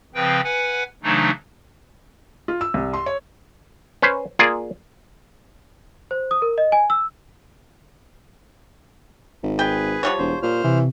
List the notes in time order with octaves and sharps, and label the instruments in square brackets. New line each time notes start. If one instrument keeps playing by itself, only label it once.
[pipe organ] C#3 F3 C4 B4 G5
B4 F#5 G#5
C#3 E3 F#3 A3 D4 D#4
[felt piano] F4
E6
C2
C6
C#5
[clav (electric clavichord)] C#4 B4 C5
A#3 F4 G#4 D5
[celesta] C5
D#6
A#4
D#5
G#5
E6
[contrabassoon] G#1
[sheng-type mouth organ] G#4 B4 [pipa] G5
[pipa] F3 G3 C#5 [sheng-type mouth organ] F#5
[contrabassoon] E1 [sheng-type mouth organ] C5
[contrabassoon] A#2 [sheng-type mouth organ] C5 F6
[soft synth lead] C3 [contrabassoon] E3